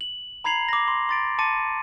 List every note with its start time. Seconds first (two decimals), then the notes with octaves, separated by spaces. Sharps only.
0.01 F#7
0.44 A#5 B5 G#6 C7 F7 F#7
0.69 D6 A#6
0.88 C6
1.09 C6 A6 D7
1.39 A5 C6 D6 A6 C#7 D#7